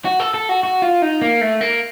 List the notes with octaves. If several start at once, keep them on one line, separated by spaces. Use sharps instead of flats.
F#4
A4
A4
F#4
F#4
F4
D#4
A#3
A3
A#3